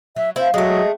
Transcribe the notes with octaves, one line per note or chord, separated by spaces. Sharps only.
F#3 E5
C4 E4 F4 C5
F#3 G#3 A3 G4 D#5